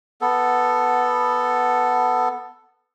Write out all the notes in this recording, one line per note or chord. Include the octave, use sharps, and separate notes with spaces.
B3 A4